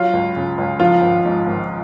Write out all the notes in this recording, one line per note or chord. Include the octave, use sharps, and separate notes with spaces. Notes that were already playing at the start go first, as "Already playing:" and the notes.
Already playing: F#3 F4
C#2
C#3
C#2
F3 F4
G#1
G#2
G#1